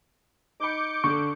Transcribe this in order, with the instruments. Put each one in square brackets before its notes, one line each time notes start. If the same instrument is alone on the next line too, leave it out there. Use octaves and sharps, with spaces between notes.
[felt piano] D#4 B5 [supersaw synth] D6 G6 C#7
[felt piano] D3 A4 [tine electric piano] C#6